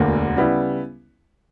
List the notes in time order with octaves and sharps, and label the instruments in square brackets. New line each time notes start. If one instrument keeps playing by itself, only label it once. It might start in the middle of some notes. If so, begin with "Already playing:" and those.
Already playing: [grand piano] E1 D2 D3 A#3
C#3 G3 B3 E4